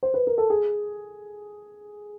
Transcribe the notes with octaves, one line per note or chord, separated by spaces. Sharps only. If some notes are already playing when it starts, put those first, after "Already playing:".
C5
B4
A#4
A4
G#4